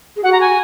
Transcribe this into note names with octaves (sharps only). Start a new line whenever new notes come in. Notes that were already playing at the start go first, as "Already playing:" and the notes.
G#4
F#4 F#5
A#5
G#5